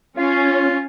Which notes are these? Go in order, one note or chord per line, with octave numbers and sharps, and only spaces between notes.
C#4 F4